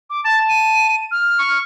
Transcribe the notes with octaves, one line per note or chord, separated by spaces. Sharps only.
D6
A5 A6
D#7
F6
C#6